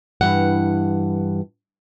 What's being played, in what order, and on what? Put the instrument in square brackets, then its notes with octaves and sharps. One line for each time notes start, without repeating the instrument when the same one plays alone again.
[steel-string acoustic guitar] G2 E3 F#5